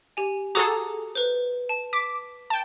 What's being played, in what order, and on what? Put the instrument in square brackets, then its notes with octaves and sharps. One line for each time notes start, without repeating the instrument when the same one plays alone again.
[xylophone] G4 G#5
[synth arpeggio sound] F#4 G#4 A4 [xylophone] A#5 D6 D#6
[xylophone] B4 C5
A5
[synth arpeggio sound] D6 [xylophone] B6
[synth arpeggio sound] G5 A5